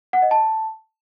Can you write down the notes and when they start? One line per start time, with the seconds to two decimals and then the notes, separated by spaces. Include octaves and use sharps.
0.13 F#5
0.22 D#5
0.31 A5